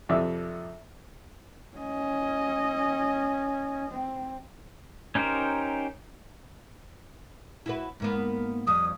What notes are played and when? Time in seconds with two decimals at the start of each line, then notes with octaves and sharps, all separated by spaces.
0.09 F2 C3 D5 E5
1.77 C#4 D#5
3.91 C4
5.15 C#4 D#4 G4 A#4 C5
7.66 E4 F#4 B4
8.00 G#2 A#3 B3
8.67 F2 G3 D#6